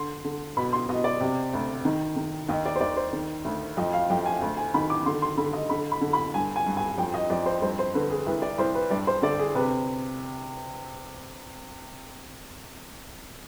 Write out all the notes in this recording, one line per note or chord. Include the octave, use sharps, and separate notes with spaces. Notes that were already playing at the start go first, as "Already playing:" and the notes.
Already playing: D3 C6
D3
B2 B5
C6
B2 D#5
D5
C3
D2
D#3
D#3
D#2 D#5
D5
C5
D#2 D5
C5
D#3
D2
F2 D#5
F5
F2 G5
G#5
D2
G#5
D#3 B5
D6
D3 C6
C6
D3 B5
D#5
D3 B5
B5
D3
B5
G2 G#5
G#5
G2
G#5
F2 G5
D#5
F2 D5
C5
G2 C5
C5
D3 B4
G#4
C2 B4
D5
C2 C5
B4
G2 D5
C5
D3 D5
G#4
C3 B4